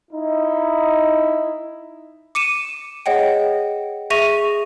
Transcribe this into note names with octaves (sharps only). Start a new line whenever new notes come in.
D#4 E4
D6 C#7 D#7 E7
G#4 C#5 D#5 F#5 G5
G#4 E5 C#6 A#6 D#7 F7